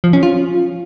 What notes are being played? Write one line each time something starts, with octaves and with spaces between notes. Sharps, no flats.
F3
C#4
F4